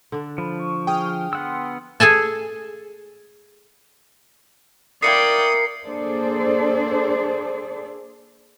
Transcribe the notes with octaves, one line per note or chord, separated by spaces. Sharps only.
D3 D4
F3 B5
C#6
G#4 G5 D#6 F6
B3 F#5 C6 E6
G#4 A4 G#5 A5
A#3 E4 A#4 D5 G5 D#6 C7 C#7
A#3 D4 G#4 A4 C5 D5